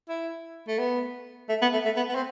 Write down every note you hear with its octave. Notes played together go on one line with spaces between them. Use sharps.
E4
A3
B3
A3
B3
A3
A3
B3
B3
C4